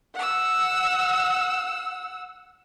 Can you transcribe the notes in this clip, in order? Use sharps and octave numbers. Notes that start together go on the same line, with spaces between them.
F#5 E6